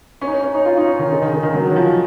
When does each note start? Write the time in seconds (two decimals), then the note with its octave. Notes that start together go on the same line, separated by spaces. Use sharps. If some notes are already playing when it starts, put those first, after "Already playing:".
0.21 C#4
0.27 D#4
0.33 C#4
0.43 C#4
0.55 D#4
0.65 F4
0.77 D#4
0.88 C#4
0.99 D#3
1.11 C#3
1.22 D#3
1.33 C#3
1.43 D#3
1.54 F#3
1.71 D#3
1.76 F3